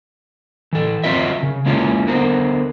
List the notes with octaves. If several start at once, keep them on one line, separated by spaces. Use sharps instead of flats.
E3 A4
F#3 C4 F4 A#4 D#5 E5
C#3
G#3 A#3 C#4 E4 F4
D3 B3 A#4 C5